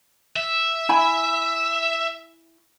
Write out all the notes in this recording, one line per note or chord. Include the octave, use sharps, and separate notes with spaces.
E5
E4 G#5 B5